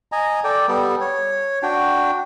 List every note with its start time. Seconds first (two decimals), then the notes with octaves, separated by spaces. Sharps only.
0.12 D#5 G#5 A#5
0.44 A4 D5 G5
0.68 G3 B3 A4
1.01 C#5
1.63 D4 F#4 G5